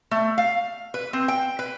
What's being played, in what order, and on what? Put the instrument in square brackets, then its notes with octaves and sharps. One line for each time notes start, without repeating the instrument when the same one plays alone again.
[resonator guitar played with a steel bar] A3
F5
B4
C4
G5
B4